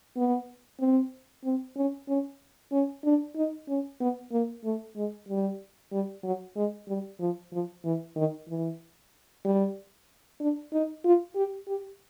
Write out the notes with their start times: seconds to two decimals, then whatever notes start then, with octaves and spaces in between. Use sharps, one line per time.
0.16 B3
0.80 C4
1.44 C4
1.76 C#4
2.08 C#4
2.72 C#4
3.05 D4
3.36 D#4
3.68 C#4
4.00 B3
4.32 A#3
4.64 A3
4.96 G#3
5.29 G3
5.92 G3
6.24 F#3
6.56 G#3
6.88 G3
7.20 F3
7.53 F3
7.84 E3
8.16 D#3
8.48 E3
9.45 G3
10.40 D4
10.72 D#4
11.05 F4
11.36 G4
11.68 G4